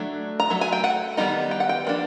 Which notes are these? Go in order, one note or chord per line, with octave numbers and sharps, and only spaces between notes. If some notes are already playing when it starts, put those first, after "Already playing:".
Already playing: F#3 A3 D4
A#5
F#3 A3
G#5
G5
F#5
D#3 G3 B3 D#4
G5
F#5
G5
F3 A#3 D4